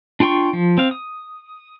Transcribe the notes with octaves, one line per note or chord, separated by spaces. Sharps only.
D4 F4 G5 C6 C#6
F3
C4 F5
D#6